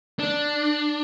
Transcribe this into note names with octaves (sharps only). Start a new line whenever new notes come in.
D4